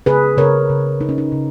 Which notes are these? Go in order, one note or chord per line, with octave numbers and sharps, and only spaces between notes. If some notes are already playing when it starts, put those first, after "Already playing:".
C#3 G#4 B4
C#3 A#4 C#5
C#3
C#3 D#4
C#4
D#4
C#3